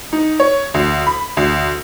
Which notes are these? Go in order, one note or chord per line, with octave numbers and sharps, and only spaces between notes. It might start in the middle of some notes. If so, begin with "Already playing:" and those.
D#4
C#5
D2
B5
D2